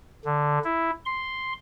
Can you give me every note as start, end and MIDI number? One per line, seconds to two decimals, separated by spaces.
0.25 0.58 50
0.64 0.90 64
1.06 1.53 84